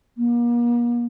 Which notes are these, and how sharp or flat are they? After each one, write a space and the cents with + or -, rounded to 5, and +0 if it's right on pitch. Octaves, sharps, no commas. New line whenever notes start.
A#3 +40